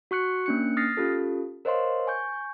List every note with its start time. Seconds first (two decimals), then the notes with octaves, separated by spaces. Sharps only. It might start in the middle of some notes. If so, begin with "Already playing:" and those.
0.11 F#4 C#6 F#6 C#7
0.46 A#3 C#4 D4 F#6 C#7
0.77 D#6 F6 A6 A#6 C7
0.97 C#4 F4 G4 A4
1.65 A#4 C5 C#5 D#5 F5 C6
2.07 G#5 C#6 G6